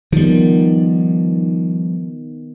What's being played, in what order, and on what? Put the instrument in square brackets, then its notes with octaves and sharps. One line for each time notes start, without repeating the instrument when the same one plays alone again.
[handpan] D#3 B3 [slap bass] F3 G3